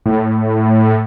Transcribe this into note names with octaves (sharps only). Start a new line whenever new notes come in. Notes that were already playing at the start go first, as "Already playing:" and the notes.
A2